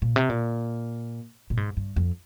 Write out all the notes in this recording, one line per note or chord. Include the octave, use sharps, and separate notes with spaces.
A#2
C3
A#2
A#2
G#2
G2
F2